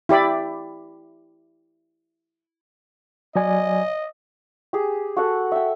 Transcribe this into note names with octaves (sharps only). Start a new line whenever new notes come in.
E4 G4 D5 B5
F#3 D5 D#5 G#5
G4 G#4
F#4 A4 F#5
E5 G5